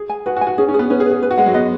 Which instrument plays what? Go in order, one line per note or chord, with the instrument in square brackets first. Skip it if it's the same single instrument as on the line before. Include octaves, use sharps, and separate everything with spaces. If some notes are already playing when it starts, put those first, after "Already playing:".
Already playing: [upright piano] G#4
[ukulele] G#5
[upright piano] F#4 [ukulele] B4
[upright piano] F#4
[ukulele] G#5
[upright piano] F#4
[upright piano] C#4 [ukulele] G#4
[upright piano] C#4
[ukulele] G#4
[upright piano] B3
[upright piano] C#4 [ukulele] B4
[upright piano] G#4
[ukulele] B4
[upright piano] G#4
[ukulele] B4
[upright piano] F#4
[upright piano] G#3 [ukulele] F#5
[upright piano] F#3
[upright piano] B3 [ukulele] D#5